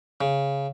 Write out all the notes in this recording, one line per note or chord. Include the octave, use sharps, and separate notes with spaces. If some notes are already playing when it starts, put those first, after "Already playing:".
C#3